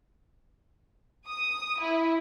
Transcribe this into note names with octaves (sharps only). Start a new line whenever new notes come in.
D#6
E4